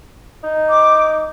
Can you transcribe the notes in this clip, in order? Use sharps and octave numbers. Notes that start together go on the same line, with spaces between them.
D#4
D6